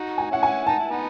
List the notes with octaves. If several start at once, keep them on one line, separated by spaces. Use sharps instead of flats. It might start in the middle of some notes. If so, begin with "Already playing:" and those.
Already playing: D#4 F#4
G#5
C#4 E4 F#5
G#5
D#4 A5
E4
B3 D#4